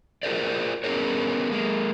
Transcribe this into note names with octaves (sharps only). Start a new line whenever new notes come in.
F4 F#4 G#4 A#4 C5 D5
B3 C#4 F#4 G#4 A#4 C#5
G#3 A#3